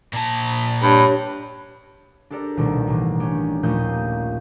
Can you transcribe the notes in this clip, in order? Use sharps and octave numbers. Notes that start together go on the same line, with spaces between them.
A#2 A5
G2 D4 G4 C#5 B5
D4 G4 A4 A#4 D5
D#1 C2 B2 D#3 A3 G4
A1 B2
C#4 D4 G4
D#3
A#1 D#2 A#2 A3 D#6 G6